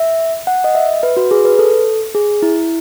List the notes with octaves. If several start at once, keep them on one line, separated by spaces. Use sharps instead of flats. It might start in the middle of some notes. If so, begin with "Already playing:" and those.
Already playing: E5
F#5
D#5
E5
B4
F#4
G#4
B4
A4
G#4
E4